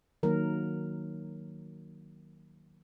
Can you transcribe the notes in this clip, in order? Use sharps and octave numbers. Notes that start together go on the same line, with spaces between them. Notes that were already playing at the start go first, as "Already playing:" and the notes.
D#3 F#3 A#3 A#4